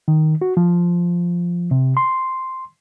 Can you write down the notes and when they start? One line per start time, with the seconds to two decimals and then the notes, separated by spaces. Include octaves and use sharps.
0.08 D#3
0.41 F#4
0.57 F3
1.71 C3
1.97 C6